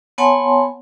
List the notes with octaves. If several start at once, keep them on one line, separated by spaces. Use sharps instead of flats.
B3 C#5 F#5 G#5 A5 C6